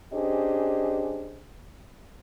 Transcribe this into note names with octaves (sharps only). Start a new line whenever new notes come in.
C#4 D4 G4 G#4 C5 D#5